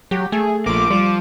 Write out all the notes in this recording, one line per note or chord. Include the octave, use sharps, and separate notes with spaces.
F#3 G4
A3 G#4
A#1 F3 A#3 D6
F3 G3